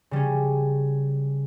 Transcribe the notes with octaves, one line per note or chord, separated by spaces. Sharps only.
C#3 G3 C#4